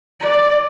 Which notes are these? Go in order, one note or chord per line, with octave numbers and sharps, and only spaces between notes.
D5